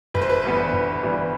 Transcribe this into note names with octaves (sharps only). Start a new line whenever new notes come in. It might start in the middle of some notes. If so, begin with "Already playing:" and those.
G1 B4
C5
B4
G2 E3 G3 B3
G1
G2 E3 G3 B3